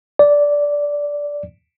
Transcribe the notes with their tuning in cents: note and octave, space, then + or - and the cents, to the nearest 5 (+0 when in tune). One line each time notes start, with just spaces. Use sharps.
D5 -10